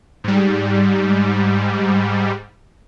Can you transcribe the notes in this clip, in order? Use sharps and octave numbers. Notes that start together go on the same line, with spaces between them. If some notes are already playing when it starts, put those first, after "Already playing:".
G#2 G3